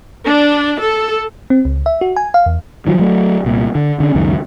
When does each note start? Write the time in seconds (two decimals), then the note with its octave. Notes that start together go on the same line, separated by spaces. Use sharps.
0.23 D4
0.79 A4
1.50 C4
1.65 C#2
1.86 E5
2.01 F#4
2.16 G#5
2.34 F5
2.46 E2
2.87 D#3 F3 F#3
2.99 F#3 A3
3.45 C2 A#2
3.75 D3
4.00 D3 C#4
4.15 C#2 F#2 D#3